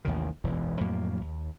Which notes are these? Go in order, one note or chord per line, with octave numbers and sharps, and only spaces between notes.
A1 D#2 C3 D#3
E1 B1 F#2 E3
F2 A2 F#3 A#3
D#2